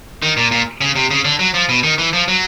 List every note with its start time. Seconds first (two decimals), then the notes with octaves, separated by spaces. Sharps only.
0.22 D#3
0.37 A#2
0.51 A#2
0.81 C#3
0.96 C3
1.10 C#3
1.25 D3
1.39 F#3
1.54 F3
1.69 B2
1.83 D#3
1.98 E3
2.13 F3
2.28 F#3